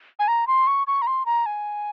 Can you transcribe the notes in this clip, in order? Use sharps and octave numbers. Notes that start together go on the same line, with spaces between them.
G#5
A#5
C6
C#6
C#6
A#5
C6
A#5
G#5